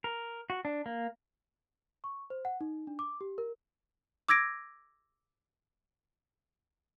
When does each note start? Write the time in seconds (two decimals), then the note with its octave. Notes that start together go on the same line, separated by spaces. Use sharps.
0.04 A#4
0.50 F#4
0.65 D4
0.86 A#3
2.04 C#6
2.30 C5
2.45 F#5
2.61 D#4
2.87 D4
2.99 D6
3.21 G4
3.38 A#4
4.28 D6 E6 G#6 A#6 D7